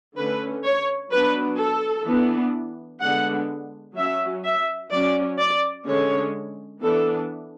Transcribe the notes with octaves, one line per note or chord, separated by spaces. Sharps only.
D3 A3 C#4 B4
C#5
F#3 B3 D4 B4
A4
E3 B3 D4
D3 G#3 B3 D4 F#5
F#3 C#4 E5
E5
F#3 C#4 D5
D5
D3 G#3 C#4 C#5
E3 B3 D4 A4